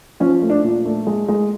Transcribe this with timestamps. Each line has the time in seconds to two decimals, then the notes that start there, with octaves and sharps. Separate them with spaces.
0.20 F3 C#4
0.42 A3
0.50 D4
0.64 A#2
0.86 A3
1.07 G#3
1.28 G#3